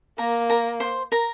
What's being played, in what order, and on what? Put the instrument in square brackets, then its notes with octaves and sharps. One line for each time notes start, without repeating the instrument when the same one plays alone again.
[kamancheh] A#3 [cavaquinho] A#4 A#5
[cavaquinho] A#4 A#5
C5 C6
A#4 A#5